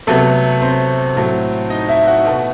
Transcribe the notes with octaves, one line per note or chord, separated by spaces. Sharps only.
C3 F#3 A3 B3 A4
C4 C5
A2 F#3 A3
D#4 D#5
E4 E5
F#4
B2 A3